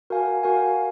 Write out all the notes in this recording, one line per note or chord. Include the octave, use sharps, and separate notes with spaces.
F#4 A#4 F5 G#5
F#4 A#4 F5 G#5